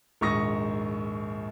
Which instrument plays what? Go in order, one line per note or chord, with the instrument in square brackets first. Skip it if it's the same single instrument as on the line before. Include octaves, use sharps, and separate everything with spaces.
[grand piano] A#1 D#2 G#2 C#6 D#6 A#6